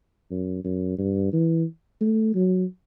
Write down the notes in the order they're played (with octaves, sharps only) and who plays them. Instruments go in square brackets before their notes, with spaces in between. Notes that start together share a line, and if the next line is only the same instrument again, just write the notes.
[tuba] F#2
F#2
G2
E3
A3
F#3